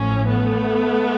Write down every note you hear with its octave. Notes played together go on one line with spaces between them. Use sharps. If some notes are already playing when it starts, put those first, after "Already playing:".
Already playing: A1 A2 F3 C#4
A3 B3